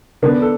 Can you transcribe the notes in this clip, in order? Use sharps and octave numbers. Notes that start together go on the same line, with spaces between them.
D3 B3 D4
A4